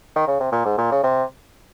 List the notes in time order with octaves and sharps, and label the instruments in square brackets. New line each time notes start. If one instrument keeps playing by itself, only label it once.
[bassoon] D#3
C#3
C3
A#2
G#2
A#2
C#3
C3